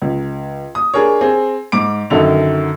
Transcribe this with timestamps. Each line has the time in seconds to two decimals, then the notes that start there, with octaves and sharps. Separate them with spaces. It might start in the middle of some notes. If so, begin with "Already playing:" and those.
0.02 C#2
0.75 D#6
0.94 D4 G#4 A#4 C#5
1.21 C4 G#4
1.72 G#2 D6 D7
2.10 F#2 D3 D#3 A4 F5 F7